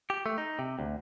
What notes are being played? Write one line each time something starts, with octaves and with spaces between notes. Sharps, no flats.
G4
A3
D#4
C3
D2